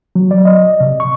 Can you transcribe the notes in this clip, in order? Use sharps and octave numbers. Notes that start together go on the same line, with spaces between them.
F#3
D5
D#5
C3
C#6